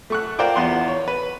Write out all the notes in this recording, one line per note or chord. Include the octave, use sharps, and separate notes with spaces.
A3 C#6 F#6
F4 A#4 C5 D5 G5 D6
E2 B3 F#5 C6
C#5
B4